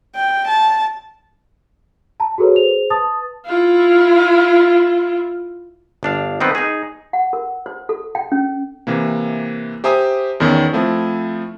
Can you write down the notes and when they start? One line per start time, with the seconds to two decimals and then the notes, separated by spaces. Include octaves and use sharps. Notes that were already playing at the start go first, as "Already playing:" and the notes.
0.15 G5
0.48 A5
2.20 A5 A#5
2.38 F#4 G#4 A4 B4 C#5
2.53 G#4 C5 F7
2.90 B4 A5 D#6 A6
3.46 E4 F4
6.03 G1 D4 F5
6.40 D#3 B3 C4 B4
6.55 D#4 G#4
7.13 F#5
7.33 A#4
7.66 C5
7.89 A4
8.15 G5
8.32 C#4
8.87 C3 E3 A#3
9.84 G4 C5 E5 G#5 A#5 D#6
10.40 E2 D#3 B3 C#4
10.73 F3 A3 C4 E4